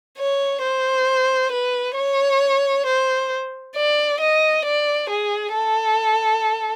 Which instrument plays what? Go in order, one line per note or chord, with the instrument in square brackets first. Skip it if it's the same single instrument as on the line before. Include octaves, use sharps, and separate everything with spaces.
[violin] C#5
C5
B4
C#5
C5
D5
D#5
D5
G#4
A4